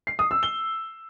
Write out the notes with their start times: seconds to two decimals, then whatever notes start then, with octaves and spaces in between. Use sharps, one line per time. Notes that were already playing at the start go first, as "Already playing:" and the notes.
0.07 C7
0.19 D#6
0.31 E6
0.43 G7